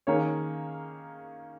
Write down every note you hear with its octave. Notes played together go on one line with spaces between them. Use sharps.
D#3 A#3 C#4 G#4 C#5